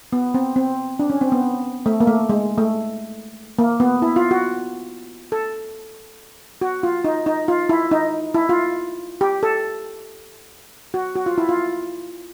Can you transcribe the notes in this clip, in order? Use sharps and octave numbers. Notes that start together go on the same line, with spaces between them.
B3
C4
C4
D4
C#4
C4
B3
A3
A#3
A3
G#3
A3
A#3
B3
E4
F4
F#4
A4
F#4
F4
D#4
D#4
F4
E4
D#4
E4
F4
G4
A4
F#4
F#4
F4
E4
F4